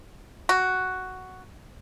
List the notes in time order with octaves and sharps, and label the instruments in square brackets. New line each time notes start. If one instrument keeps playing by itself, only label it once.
[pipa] F#4